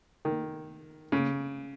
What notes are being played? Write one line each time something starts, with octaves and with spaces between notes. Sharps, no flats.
D#3
C#3